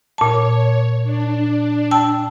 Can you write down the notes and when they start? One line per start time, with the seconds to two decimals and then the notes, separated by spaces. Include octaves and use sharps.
0.18 A#2 C#5 A5
1.04 D4
1.91 G5 A5 E6